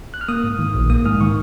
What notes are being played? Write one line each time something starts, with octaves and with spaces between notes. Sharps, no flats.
F#6
F6
A#3 D#6
G#2
D#3
A#1
A#3 D#6
G#2 F6
D#3 C#6